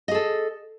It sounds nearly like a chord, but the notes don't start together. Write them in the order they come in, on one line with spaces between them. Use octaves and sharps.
D#5 G#4 A4